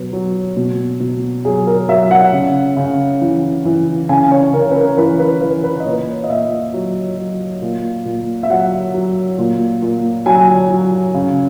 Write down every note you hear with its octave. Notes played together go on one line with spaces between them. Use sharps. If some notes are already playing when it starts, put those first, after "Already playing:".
Already playing: B2 F#3 B4
F#3
B2
B2
F#3 G#4
A#4
F#3 E5
F#5
C#3
C#3
E3
E3
C#3 G#5
C#5
C#3 A#4
B4
A#4
E3 B4
B4
E3 B4
B4
D#5
A#2 C#5
D#5
A#2 E5
F#3
F#3
A#2
A#2
E5
F#3 F#5
F#3
A#2
A#2
F#3 G#5
F#3
C#3